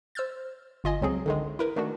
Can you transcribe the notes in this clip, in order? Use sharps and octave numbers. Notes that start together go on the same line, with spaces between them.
C5 E6 F6 G6 A6
G1 F4 D#5 G#5
C#2 F#3 C4 G#4
D3 D#3 G#3
E4 A#4 B4
D#3 A3 D4 F#4